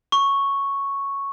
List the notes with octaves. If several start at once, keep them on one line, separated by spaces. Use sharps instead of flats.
C#6